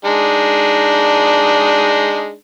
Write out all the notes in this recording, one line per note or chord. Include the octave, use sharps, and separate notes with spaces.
G#3 D4 D#4